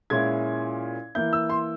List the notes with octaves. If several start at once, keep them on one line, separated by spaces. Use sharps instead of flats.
A#2 G#3 C#4 E4 G#6
E3 A#3 E4 G6
E6
C6